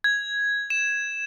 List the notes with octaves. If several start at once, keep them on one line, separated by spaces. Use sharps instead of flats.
G#6
E7